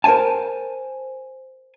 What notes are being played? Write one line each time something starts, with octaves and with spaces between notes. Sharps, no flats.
A#4 C5 D5 G#5 A5